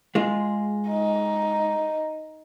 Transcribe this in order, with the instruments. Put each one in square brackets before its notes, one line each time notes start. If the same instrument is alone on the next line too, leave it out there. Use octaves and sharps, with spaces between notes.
[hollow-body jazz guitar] G#3 F4
[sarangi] D#4